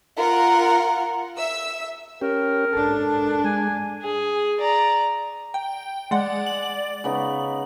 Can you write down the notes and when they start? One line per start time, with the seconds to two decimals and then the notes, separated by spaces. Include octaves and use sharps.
0.18 F4 A#4 F#5
1.38 E5 E6
2.21 C#4 G4 A#4
2.73 G#2 D4 A4
3.44 G#3 G#5
4.02 G#4
4.60 D5 A#5
5.54 G5
6.11 G#3 D5 F#5
6.46 F#7
7.04 C#3 B3 D#4